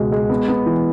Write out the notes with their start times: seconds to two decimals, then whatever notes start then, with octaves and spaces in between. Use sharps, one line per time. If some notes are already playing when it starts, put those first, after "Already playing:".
Already playing: C#2 B2 G#3
0.12 G#3
0.30 B3
0.48 B3
0.66 E3